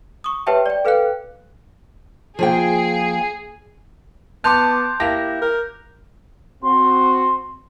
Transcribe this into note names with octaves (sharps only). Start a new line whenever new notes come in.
C#6 D#6
G4 B4 C#5 E5 G5 A5
D5 G5
A4 B4 F5 G5 F#6
F3 A#3 G#4 G5
B3 A5 C6 D6 F#6 G6 F7
A#3 E4 G4 A#6
A#4
C4 F#4 C6